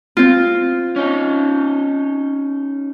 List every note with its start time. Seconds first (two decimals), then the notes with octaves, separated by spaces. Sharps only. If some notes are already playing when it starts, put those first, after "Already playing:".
0.17 C4 F4
0.96 C#4 D#4